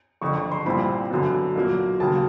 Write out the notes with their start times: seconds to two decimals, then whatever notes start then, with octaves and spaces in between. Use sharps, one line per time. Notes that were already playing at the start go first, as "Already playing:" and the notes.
0.21 F#1 F2 D3 C#6
0.37 C#6
0.52 C6
0.66 A#1 A#2 G3 C4 E4 B5
1.11 F#2 D3 F#3 B3
1.56 B1 A#2 F#3 A#3
2.00 D#2 C#3 F#3 A#3 A5